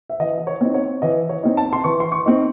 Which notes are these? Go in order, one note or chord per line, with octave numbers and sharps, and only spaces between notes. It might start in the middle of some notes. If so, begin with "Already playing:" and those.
E5
E3 D#5
D#5
C#5
C4 D#4
C#5
E3 D#5
C#5
C4 D#4
A5
C6
E3 C#6
C6
C#6
C4 D#4